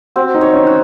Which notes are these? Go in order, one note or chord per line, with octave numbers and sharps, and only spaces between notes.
C4 F#4
D#4
C#5
C#4
F#4